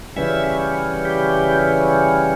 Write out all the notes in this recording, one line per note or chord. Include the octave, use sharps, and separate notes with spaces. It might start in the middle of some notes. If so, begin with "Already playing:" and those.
C#3 E3 G3 C#4 E5
G4